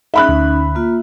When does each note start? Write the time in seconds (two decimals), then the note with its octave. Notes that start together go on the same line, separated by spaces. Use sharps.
0.14 C#4 D#4 E5 B5 F#6
0.28 D2
0.75 A#3 F4